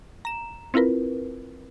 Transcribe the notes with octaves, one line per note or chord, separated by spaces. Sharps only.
A#5 E7
C4 E4 F4 A#4 B4